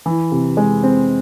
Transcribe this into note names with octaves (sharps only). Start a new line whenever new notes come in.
E3
C3
G#3
C4